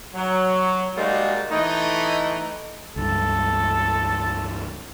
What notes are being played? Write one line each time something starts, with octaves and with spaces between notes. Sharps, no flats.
F#3
G3 G#3 A#3 D#4 F#4
E3 A3 D#4
C#2 G2 A4